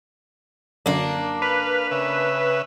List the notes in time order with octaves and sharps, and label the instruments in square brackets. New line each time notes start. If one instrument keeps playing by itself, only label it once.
[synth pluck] F#2 D3 [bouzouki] A#3 D4
[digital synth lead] B4 [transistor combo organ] F5
[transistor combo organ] C#3 E5